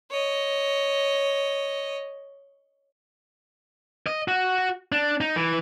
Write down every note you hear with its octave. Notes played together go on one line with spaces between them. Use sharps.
C#5 D#5
D#5
F#4
D4
D#4
E3